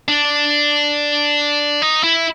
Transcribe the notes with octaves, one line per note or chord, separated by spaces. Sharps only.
D4
D#4
E4